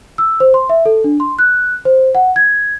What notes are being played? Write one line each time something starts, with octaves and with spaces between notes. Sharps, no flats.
E6
C5
C6
E5
A4
D4
C6
F#6
C5
F#5
G#6